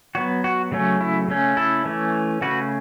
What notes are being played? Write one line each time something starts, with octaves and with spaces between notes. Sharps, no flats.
F#3 B3 F#4
F#4
C#3 F#3 A3 C#4
E4
C#3 A3 C#4
E4 A4
E3 A3 C#4
C#3 A3 C#4 F#4 B4